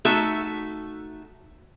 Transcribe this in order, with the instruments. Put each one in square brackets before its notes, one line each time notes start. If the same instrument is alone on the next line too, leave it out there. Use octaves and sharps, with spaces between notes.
[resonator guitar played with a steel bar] A3 D#4 F#4 A4 E5